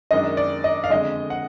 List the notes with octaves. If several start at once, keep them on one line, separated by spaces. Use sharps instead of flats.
F#2 D#3 G#3 D4 D#5
D5
D#5
F5
F2 D3 G#3 D#5
F#5